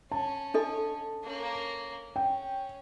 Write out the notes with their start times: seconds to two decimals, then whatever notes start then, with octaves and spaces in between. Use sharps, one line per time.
0.12 C#4 A5
0.54 D4 A4 D#5
1.24 A#3 C#4
2.16 C#4 G5